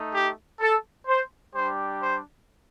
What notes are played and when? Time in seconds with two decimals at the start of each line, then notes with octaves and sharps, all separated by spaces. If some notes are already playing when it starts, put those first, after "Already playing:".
Already playing: A3 D#4
0.13 G4
0.60 A4
1.07 C5
1.54 G3 D4 G4 C5
2.01 C5